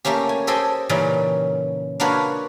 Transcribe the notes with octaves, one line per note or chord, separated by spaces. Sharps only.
A3 A#3 C#4 G4
G#5
G4 A4 C5 D#5 G5 G#5
A#2 C#3 E3 G3 C#4 D#4
A#3 D4 F4 F#4 B4 C#5